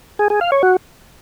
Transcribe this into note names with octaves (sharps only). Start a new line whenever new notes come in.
G#4
G#4
F5
C#5
F#4